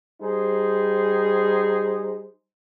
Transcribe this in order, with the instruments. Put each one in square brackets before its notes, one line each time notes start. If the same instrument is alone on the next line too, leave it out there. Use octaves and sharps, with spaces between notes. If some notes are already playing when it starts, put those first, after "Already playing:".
[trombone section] G3 D#4 G#4 C5